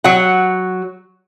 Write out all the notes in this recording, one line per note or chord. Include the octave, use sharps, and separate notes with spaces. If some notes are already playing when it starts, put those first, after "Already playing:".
F#3 F#5